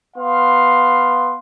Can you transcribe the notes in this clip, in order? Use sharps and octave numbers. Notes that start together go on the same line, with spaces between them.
B3 F5 C6